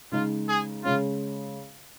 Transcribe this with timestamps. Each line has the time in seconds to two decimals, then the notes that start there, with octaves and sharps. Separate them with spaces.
0.12 C#3 G#3 D#4 F4
0.48 G#4
0.84 C#3 G#3 C#4 F4